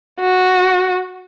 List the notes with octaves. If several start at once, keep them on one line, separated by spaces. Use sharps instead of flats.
F#4